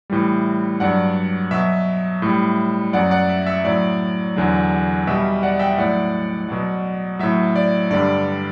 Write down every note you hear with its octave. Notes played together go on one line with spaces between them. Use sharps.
A2 E3 G3
G2 F#3 D5 F#5
B2 F#3 E5
A2 G3
F#2 F#3 D5 F#5
D5 F#5
E5
E5
A2 F#3 D5
E2 D3 F#3
B2 G3 E5
D5 F#5
E5 G5
A2 F#3 D5 F#5
B2 F#3
A2 F#3 E5
D5
G2 D3 G3 D5